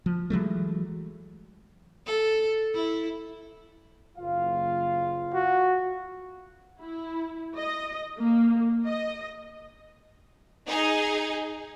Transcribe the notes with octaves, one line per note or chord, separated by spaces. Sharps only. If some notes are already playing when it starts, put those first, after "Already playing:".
F3
E3 F#3 G#3 A3
A4
E4
F#1 F4 F5
F#4
E4
D#5
A#3
D#5
D#4 G#4